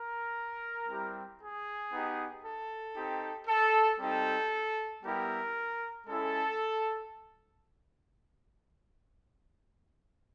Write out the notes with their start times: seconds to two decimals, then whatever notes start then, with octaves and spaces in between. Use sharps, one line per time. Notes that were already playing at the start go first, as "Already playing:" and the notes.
Already playing: A#4
0.88 G3 C4 E4 G4
1.40 G#4
1.92 B3 D#4 G4
2.44 A4
2.96 C4 D#4 G4
3.48 A4
4.00 G3 C4 D#4 G4 A4
5.04 G3 B3 E4 G4 A#4
6.07 G#3 C#4 E4 A4